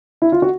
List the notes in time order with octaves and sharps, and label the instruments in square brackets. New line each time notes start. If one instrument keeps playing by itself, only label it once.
[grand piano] E4
F4
F#4